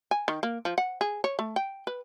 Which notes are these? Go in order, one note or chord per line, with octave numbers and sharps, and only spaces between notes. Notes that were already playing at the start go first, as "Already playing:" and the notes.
G#5
D#3
A#3
F3
F#5
G#4
C#5
A3
G5
B4